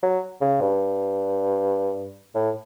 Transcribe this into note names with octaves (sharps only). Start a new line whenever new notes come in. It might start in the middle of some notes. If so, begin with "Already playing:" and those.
F#3
C#3
G2
A2